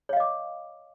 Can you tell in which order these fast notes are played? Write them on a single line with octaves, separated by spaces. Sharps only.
C#5 F5 D#5 D6